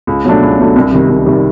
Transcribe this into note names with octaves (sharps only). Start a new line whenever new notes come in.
C#2
B2 F#3 A3 D4
C#2
B2 F#3 A3 D4
C2
C3 D#3 G3
C2
C3 D#3 G3